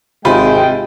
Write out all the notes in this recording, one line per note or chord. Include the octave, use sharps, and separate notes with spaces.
G#1 C3 G#3 F4 G5 B5